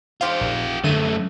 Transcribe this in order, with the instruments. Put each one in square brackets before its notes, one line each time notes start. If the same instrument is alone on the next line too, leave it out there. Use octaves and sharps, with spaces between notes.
[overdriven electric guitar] F4 G4 [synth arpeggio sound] C5 F5
[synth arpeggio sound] A#1
[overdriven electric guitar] F#2 A3 [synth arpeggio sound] D3 D#7